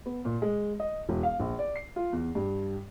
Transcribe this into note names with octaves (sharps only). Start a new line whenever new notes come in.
B3
A#2
G#3
D#5
E1
F5
A#1
D5
C7
F4
E2
G2